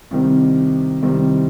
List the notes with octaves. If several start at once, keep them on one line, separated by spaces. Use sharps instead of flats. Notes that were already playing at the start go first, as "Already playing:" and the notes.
C2 C3 D#3 G3 C4
C2 C3 D#3 G3 C4